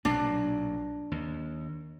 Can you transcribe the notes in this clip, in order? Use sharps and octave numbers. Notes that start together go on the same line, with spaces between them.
B1 A#2 F#3 D4
D#2